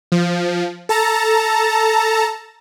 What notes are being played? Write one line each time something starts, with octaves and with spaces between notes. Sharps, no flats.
F3
A4 A5 A#5